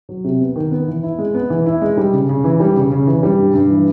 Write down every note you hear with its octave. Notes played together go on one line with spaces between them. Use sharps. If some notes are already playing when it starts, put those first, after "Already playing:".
F#3
C3
B3
D#3
B3
E3
E4
G#3
B3
E3
E4
G#3
G3
C#3
C#3
E3
G3
C#3
C#3
E3
G3
G2
G2
E3